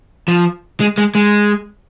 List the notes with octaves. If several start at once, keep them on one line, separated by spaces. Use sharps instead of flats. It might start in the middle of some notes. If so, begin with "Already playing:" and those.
F3
G#3
G#3
G#3